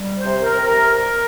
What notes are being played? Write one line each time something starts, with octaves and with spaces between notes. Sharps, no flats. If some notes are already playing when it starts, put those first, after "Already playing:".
Already playing: G3
C5
C3
A#4
C3
A#4
G3 A#4